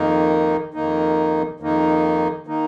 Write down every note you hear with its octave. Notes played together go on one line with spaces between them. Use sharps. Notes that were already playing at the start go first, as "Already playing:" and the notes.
Already playing: F2 D#3 A#3 D#4
F2 D#3 A#3 D#4
F2 D#3 A#3 D#4
D#3 A#3 D#4